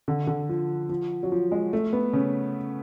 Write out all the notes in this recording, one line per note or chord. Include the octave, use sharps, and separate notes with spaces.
D3
D3
F3
F3
F#3
F3
G#3
A3
B3
C#3